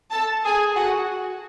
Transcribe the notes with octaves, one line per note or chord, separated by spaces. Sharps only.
A4 A5
G#4 G#5
F#4 F#5